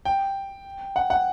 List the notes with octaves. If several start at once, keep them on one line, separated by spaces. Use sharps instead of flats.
G5
F#5
F#5